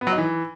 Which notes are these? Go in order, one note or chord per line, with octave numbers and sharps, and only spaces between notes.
B3
F#3
D#4
E3